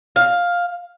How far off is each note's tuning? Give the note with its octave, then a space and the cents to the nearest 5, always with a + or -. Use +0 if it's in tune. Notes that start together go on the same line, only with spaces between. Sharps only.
F5 +10